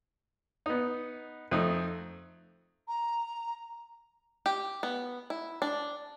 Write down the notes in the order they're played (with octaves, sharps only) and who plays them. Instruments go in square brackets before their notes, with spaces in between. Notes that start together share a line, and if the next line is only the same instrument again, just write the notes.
[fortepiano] B3 D#4
F2 A3 D#4
[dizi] A#5
[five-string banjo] G4
B3
E4
D4